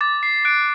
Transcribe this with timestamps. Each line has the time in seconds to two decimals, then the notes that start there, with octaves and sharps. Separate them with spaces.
0.01 D6 A6
0.23 C7
0.45 F#6 D7